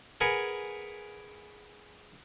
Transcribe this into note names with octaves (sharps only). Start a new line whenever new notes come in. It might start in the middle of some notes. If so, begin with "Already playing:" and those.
G#4 A#4 B4 F#5 G#5